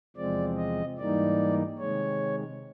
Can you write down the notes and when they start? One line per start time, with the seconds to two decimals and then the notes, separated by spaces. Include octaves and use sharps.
0.16 E2 C3 F3 G#3 C4 D5
0.57 D#5
0.98 G#2 E3 G3 A#3 D#4 D5
1.78 C3 D#3 G#3 C#5